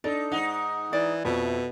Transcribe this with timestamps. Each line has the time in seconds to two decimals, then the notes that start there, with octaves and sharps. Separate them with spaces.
0.04 D4 D#4 A4 D5
0.32 G#2 D#4 F#5
0.93 E3 D5
1.25 F2 B2 A3